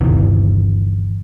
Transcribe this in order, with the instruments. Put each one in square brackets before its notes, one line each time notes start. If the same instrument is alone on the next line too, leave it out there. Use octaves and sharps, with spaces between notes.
[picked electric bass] G1 D#2 C3 E3